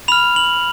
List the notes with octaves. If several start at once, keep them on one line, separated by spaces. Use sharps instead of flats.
B5 F6 F7
F#7